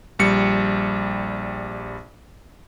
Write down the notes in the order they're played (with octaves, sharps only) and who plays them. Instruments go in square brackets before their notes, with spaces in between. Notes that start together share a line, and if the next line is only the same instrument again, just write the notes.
[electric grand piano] A#1 G3 C#7